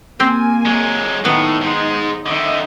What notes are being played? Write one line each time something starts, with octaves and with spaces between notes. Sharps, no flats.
A#3 C4 G4 C5 G#5
F#3 G#3
A2 D#3 F#3 B3 D#4
G#2 G#3
D3 D#3 D#5 E5